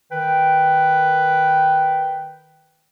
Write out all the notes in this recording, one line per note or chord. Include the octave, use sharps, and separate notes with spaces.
D#3 B4 G5